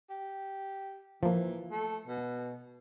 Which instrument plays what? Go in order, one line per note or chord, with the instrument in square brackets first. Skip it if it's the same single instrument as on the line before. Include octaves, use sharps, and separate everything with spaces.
[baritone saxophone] G4
[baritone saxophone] E3 [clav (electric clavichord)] F3 A#3
[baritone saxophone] A3
B2